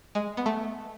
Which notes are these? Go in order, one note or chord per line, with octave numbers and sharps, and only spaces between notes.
G#3
B3
A3